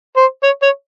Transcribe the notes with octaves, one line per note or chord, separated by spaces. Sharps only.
C5
C#5
C#5